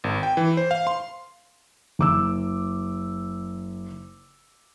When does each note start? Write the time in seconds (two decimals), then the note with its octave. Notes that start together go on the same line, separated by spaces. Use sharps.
0.04 G#1
0.23 G5
0.37 E3
0.57 C5
0.71 F5
0.87 C6
1.99 F#1 D6 E6